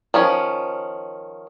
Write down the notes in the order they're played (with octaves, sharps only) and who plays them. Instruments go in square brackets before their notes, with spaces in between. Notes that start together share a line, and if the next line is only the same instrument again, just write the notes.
[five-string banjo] D#3 F3 C#4